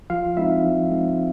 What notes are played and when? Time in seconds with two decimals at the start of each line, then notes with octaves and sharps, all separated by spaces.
0.10 F3 F4 F5
0.37 G#3 C4 D#4 E4 E5
0.64 F3
0.91 G#3 C4 D#4